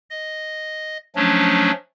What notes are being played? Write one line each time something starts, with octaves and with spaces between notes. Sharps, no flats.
D#5
F3 F#3 A3 C#4 D4